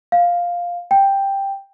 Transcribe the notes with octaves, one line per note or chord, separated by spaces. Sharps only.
F5
G5